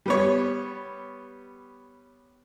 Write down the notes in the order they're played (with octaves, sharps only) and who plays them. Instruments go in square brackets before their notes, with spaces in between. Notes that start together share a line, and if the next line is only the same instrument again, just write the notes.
[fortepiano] G3 B3 C#5